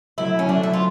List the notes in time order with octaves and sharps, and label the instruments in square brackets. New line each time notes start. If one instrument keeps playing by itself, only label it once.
[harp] F#3 A3 C4 [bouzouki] E4
[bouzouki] C#4
[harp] F#3 A3 C4 [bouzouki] D4
[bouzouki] E4
F4